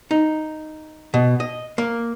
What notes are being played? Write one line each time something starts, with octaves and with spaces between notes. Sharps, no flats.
D#4
B2
D#5
A#3